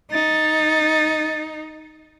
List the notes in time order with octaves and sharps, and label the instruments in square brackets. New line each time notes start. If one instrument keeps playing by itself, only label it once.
[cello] D#4 [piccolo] A6